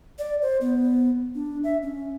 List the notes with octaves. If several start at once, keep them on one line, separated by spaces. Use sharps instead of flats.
D5
C5
B3
D4
E5
C#4